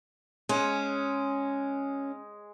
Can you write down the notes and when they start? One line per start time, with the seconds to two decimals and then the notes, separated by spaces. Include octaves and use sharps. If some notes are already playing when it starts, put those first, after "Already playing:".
0.49 G#3 C#4